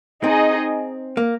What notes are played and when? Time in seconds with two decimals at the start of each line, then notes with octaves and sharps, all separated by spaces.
0.24 C4 D#4 G#4 D#5
1.17 A#3